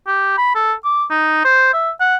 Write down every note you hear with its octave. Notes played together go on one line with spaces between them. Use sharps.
G4
B5
A4
D6
D#4
C5
E5
F#5